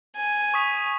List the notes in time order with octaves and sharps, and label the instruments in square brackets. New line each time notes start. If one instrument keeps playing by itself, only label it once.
[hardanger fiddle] G#5
[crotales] C#6 D#6 B6